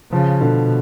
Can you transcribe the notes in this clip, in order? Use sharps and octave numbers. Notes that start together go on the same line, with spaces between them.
C#3 F3
B2 D3